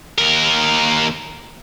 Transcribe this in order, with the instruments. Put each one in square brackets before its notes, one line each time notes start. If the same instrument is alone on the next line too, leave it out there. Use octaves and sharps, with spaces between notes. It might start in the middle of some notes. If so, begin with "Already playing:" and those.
[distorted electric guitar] D#2 A#4